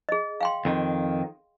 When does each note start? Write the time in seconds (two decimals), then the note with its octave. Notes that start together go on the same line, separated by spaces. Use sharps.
0.09 G#4 D#5
0.41 F5 G5 C6
0.65 F2 D#3